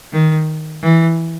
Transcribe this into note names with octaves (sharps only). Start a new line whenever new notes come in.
D#3
E3